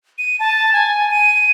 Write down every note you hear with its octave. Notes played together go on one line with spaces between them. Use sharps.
D#7
A5
G#5
D#7